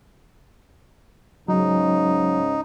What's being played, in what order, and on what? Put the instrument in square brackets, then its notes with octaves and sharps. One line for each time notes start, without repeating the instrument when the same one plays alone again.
[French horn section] G#2 C#3 C#4 [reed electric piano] F#3 [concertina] D#4